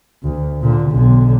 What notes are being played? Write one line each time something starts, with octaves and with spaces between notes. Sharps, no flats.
D2
A#2 D3
B1 D3